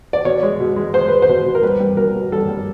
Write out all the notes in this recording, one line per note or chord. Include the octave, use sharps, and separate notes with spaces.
D5
B2 C#5
G#3
B2
G#3
G#3 C5
G#3 B4
C5
B2
B2
A#4
G3 B4
G3
B2 A#4
B2
G3 A4
G3